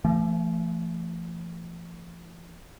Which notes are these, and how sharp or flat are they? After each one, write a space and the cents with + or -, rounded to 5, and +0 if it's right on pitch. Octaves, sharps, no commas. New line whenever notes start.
F3 -40 A3 +20